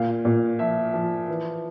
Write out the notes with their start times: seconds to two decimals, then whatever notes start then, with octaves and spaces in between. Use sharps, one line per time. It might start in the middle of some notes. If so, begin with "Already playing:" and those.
Already playing: A#2 F5
0.25 A#2
0.59 F3 E5
0.94 F3
1.28 E3